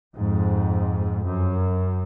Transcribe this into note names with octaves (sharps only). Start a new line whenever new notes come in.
F2 G#2
F#2